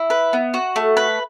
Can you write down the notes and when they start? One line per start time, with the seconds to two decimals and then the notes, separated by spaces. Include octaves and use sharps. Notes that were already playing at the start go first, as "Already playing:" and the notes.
Already playing: E4
0.10 B4
0.33 B3
0.54 F#4
0.76 A3
0.97 B4